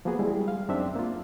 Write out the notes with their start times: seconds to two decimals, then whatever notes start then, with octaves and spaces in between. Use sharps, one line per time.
0.05 F3 A#3 B3 F#4 G#4 B4
0.19 G3 G#3 E4 G#4
0.48 F5
0.69 F#2 C4 D4 D#4 E5
0.96 A#3 F4